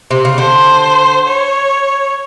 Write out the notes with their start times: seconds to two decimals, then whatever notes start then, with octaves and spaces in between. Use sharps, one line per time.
0.11 C3
0.25 C#3
0.38 D3 C5
1.28 C#5